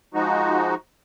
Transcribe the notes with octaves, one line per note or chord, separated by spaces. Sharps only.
F3 G#3 D#4 F#4